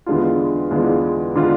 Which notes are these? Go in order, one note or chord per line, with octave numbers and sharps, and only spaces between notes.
E2 D3 G#3 D4 F4
E2 D3 G#3 D4 F4
D3 G#3 D4 F4